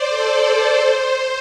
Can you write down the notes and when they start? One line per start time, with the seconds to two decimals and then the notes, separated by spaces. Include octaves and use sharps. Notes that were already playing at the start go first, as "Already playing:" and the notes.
Already playing: C5 D5
0.09 A4
0.41 C5
0.75 C5